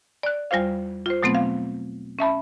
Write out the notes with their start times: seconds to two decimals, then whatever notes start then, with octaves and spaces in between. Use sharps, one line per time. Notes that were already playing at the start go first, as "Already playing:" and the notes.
0.23 D5 F#6
0.51 E2 G3 F4 C5 F5
1.06 F4 C5
1.23 B2 F#3 A3 B3 C4
1.35 F5
2.19 C#4 E5 A5 B5